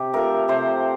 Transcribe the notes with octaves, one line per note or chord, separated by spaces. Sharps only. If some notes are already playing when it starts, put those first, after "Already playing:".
Already playing: C3 G4
F3 A3 A#4
C3 C5